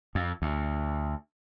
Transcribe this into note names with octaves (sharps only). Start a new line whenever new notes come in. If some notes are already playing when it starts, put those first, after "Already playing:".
F2
D2